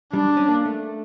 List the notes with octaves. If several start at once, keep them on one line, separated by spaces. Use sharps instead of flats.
G3 D4
C#4
A#3
A3